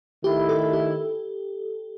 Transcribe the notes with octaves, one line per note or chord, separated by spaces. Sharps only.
D#3 A3 E4 G4
A4
G4